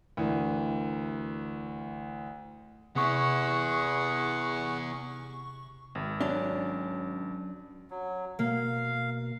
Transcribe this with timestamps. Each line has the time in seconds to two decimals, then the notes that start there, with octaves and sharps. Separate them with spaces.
0.17 D2 E3 A#4
2.96 C3 B3 E4 G#4 F#5 C#6
5.95 G#1
6.20 F#3 C#4 D4
7.90 F#3
8.39 B2 A#3 F5